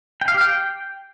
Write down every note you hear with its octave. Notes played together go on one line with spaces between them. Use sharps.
G5
F5
G4
G5